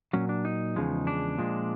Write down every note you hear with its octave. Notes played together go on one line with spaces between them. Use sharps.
A#2 F#3 C#4
D4
D#4
E2 C#3 F3 G#3
D4
A#2 F3 G#3